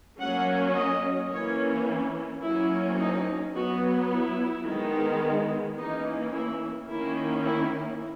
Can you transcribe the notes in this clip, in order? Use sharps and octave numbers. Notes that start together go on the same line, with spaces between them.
F#3 A#3 C#4 F#5
D#5
E3 A#3 C#4 C#5
E4
F#3 A#3 C#4 E4
D#4
F#3 B3 F#4
E4
D#3 G#3 B3
E3 A#3 C#4 D#4
E4
D#3 A#3 C#4 E4
E4